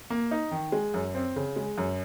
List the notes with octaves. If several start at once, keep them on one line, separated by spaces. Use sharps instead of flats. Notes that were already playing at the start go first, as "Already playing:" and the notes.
A#3
D#4
D#3
G#3
F#2
C4
C#3
G#3
F#2